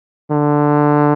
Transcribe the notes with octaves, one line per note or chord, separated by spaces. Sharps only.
D3